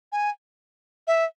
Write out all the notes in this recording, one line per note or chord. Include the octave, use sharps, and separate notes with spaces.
G#5
E5